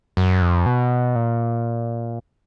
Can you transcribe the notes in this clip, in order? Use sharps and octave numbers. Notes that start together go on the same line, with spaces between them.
F#2
F2
B2
A#2